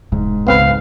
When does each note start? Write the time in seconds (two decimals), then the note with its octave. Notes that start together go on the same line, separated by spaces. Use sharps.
0.12 E1 G#2 B2
0.47 C#2 B3 C4 B4 F5